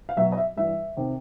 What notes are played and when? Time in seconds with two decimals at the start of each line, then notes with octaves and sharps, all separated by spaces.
0.09 F5
0.16 B2 F#3 E5
0.32 D#5
0.37 E5
0.57 G2 E3 G3 E5
0.97 C3 D#3